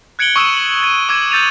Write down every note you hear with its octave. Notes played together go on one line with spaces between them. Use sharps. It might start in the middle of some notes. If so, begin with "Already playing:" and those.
F#6 G#6 C#7 D7 F#7 G7
C#6 D#6 E6 C#7 D#7 E7
F#7
G#6 D#7
D6 E6 G#6 D#7 E7
E6 G6 A6 C#7 D#7 F7